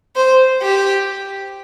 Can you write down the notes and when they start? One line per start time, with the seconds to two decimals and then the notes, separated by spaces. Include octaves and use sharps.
0.16 C5
0.63 G4